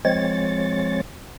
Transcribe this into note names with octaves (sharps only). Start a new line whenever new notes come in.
F3 G#3 C4 C#5 A6